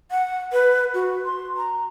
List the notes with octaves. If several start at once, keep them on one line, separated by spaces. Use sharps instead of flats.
F#5
B4
F#4
C6
A#5